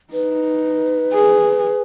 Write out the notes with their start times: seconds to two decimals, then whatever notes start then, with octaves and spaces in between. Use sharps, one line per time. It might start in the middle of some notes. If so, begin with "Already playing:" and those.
0.13 D#4 B4
1.13 G#4